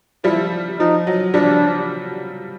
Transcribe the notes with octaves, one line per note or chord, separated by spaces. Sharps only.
F3 G3 E4
F3 D#4
F#3
F3 G3 D4